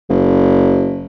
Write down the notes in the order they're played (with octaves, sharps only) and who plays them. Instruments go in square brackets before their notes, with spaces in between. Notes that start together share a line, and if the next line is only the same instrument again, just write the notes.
[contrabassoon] F#1